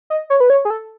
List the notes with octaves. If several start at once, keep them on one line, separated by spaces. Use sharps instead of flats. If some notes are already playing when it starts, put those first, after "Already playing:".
D#5
C#5
B4
C#5
G#4
A4